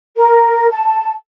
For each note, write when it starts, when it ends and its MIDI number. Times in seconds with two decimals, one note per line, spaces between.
0.17 0.68 70
0.71 1.11 81